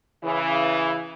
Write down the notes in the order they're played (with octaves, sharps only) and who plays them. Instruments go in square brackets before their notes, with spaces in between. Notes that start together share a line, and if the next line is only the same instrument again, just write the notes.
[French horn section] C#3 E3